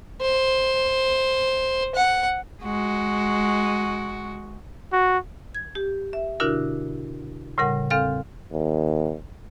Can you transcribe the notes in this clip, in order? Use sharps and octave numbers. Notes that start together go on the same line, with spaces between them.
C5
F#5
G#3 F#4
F#4
G#6
G4
E5
B2 D3 D4 E4 F#4 A#4
A2 C#3 G3 A#4 F#5
E2 C4 A4 F5 F6
D#2